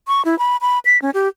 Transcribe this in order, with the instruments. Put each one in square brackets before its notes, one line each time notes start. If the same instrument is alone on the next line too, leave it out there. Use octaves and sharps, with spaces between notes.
[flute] C#6
E4
B5
B5
B6
C#4
G4